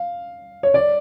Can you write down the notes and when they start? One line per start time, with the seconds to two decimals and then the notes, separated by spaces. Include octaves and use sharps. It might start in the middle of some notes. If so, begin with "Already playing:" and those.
Already playing: F5
0.63 C#5
0.74 D5